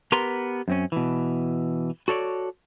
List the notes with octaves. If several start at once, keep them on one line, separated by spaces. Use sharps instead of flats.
B3 G4 A#4 B4 A#5 C6
F#2 C4 C#4
B2 E3
F#4 A4 C#5 D5